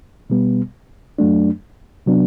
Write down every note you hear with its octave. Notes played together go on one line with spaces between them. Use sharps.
B2 G3 B3
F#2 F#3 A3 D4
C3 F#3 B3 D4